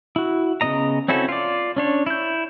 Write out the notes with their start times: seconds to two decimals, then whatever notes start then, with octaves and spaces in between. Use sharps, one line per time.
0.16 E4 F#4
0.61 C#3 A3 B3 D#5 A#5
1.08 C4 C#4 E4 F#4 A4
1.29 F4 D5
1.76 C#4 D4 C#5
2.06 E4 G6